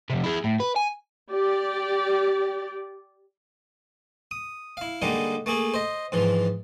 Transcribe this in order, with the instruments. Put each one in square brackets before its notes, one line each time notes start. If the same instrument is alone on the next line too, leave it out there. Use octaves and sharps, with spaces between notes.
[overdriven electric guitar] F2 C3
E4 G#4
A2
B4
G#5
[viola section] G4 D5
[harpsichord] D#6
E4 F5
D3 G3 G#3 A#3 D#4
A3 A#3 G#4 A4
C5 D#5
G#2 E3 F3